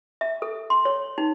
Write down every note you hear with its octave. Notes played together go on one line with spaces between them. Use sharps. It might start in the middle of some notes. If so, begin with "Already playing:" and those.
E5
A4
C6
C#5
D#4